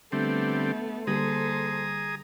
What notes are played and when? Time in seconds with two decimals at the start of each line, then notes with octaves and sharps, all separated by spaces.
0.12 D3 G3 A3 B3 C4
1.07 D3 G3 A#3 G#4 A4 C5 A#5 D#6